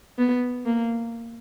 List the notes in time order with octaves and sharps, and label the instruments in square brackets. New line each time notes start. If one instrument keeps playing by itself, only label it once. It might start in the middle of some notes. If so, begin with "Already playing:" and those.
[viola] B3
A#3